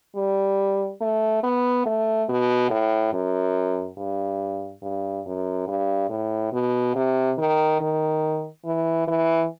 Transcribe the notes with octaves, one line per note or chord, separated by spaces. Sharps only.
G3
A3
B3
A3
B2
A2
F#2
G2
G2
F#2
G2
A2
B2
C3
D#3
D#3
E3
E3